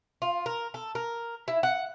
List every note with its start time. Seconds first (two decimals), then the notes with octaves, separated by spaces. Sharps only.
0.22 F4
0.46 A#4
0.74 A4
0.95 A#4
1.48 E4
1.63 F#5